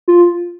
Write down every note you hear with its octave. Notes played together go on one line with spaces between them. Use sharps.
F4